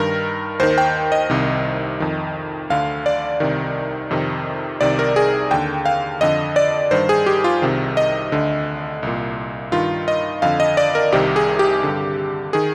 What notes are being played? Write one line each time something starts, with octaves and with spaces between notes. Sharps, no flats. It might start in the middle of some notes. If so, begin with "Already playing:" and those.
Already playing: G2 D#3 A#4
D#2 D#3 C5
G5
D#5
C2 C3 D#3
F2 D#3
D2 D3 F5
D5
C2 C3 D#3
F2 C3 D#3
C2 C3 D#3 D5
A#4
G#4
D#2 D3 G5
F5
F2 D3 D#5
D5
G2 D#3 C5
G#4
G4
F4
C2 C3 D#3
D#5
D2 D3
C2 A#2
G2 D#3 F4
D#5
F2 D3 F5
D#5
D5
A#4
C2 C3 D#3 G4
G#4
G4
G2 D3
D#3 G#4